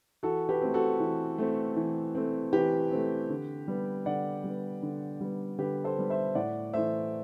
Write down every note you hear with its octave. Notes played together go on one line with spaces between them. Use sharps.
E3 F#4 A4
G4 B4
A3 C4
F#4 A4
E3
A3 C4
E3
A3 C4
E3 G4 B4
A3 C4
D3
G3 B3
D3 D5 F#5
G3 B3
D3
G3 B3
D3 G4 B4
A4 C5
G3 B3
C5 E5
A2 D5 F#5
E3 A3 C5 E5